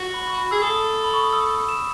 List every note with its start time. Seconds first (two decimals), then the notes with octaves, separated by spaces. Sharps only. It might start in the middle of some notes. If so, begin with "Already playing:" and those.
Already playing: F#4
0.14 B5
0.27 C#6
0.38 B5
0.51 G#4 E6
0.61 A4 D#6
1.04 B5
1.14 C#6
1.24 D#6
1.33 E6
1.69 E7